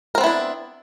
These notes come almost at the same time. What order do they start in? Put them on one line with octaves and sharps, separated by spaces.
A#4 C4 B3 E4 D4